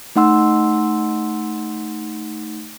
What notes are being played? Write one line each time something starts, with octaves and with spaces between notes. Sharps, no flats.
A3 D#4 F#5 C6 E6